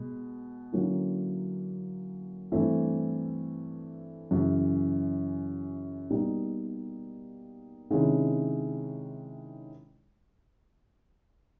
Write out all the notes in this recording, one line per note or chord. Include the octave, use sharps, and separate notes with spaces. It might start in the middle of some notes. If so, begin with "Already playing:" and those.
Already playing: B2 G#3
D3 F#3 A#3 C#4 E4
G2 E3 A3 C4 E4
F#2 C#3 E3
B2 G3 A#3 D#4
C3 D#3 G#3 C#4 E4